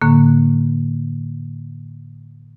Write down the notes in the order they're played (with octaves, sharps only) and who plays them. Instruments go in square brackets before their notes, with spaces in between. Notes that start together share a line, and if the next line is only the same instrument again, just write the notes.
[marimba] A2 D3 A#3